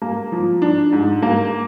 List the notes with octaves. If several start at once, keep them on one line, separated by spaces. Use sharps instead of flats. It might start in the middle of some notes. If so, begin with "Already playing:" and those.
A#3
F3
D4
G#2
A#3